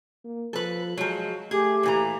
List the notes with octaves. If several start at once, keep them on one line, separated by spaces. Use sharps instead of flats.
A#3
F3 A4 B4
F3 F#3 G#3
A3 G4 G#4
A#2 E3 A#5